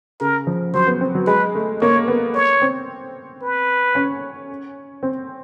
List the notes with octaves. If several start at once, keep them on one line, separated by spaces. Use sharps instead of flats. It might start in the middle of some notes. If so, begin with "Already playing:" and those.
C#3 A#4
F3
F#3 C5
B3
C4
F#3
G#3 B4
A3
A#3 C#5
B3
C#5
C4
B4
C#4
C4